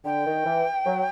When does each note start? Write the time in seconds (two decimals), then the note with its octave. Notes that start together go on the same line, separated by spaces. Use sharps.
0.05 D3 G5
0.25 D#3
0.45 E3
0.85 F#3